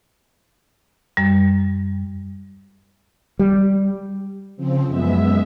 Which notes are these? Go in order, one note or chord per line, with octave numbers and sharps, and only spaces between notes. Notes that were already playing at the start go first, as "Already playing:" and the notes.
F#2 G3
G3
C#3 F3 C4
F#2 G#3 B3 E5